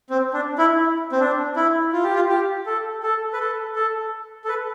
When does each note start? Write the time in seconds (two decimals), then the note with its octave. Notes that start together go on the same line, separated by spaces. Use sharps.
0.10 C4
0.33 D4
0.58 E4
1.12 C4
1.20 D4
1.56 E4
1.93 F4
2.03 G4
2.15 F4
2.29 G4
2.66 A4
3.03 A4
3.33 B4
3.40 A4
3.76 A4
4.44 A4
4.49 B4